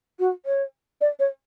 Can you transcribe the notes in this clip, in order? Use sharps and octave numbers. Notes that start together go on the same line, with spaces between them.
F#4
C#5
D5
C#5